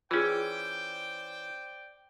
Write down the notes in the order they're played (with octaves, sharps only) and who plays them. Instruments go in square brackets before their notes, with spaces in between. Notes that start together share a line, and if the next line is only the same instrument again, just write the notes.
[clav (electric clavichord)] E3 C#4 [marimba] F4 G#4 [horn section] C5 D5 G5